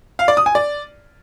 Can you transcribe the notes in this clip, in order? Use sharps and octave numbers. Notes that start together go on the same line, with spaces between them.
F5
D5
D#6
G#5
D5